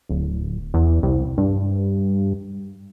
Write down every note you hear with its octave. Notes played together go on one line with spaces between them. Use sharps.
D1
E2
C2
G2